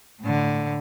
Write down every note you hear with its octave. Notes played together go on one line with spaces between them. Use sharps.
A2 D3